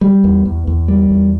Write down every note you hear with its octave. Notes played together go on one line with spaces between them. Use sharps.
G3
E2
E2
E2
G3
E2